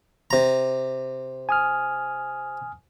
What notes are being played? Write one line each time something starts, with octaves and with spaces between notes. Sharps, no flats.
C3 A#5
G#5 D#6 F6